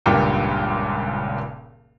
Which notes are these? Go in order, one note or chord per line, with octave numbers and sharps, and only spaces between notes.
D#1 C#2 G2 A#2 G5